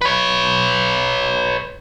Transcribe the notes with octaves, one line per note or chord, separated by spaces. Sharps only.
B4 C#5